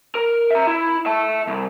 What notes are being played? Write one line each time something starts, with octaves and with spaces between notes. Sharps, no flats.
A#4
E5 A#5
E4
E5 A5
C2